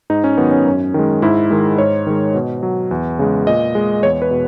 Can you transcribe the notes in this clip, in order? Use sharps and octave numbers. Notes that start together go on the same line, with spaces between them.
G#2 D#4
C#4
D#3 F#3 B3
C#4
F#2
D#3 G#3
G#2 E4
D#3 G#3
G#2 C#5
D#3 G#3
B2
F#3
E2
C#3 G#3
A#2 D#5
G#3
E2 C#5
B4
B2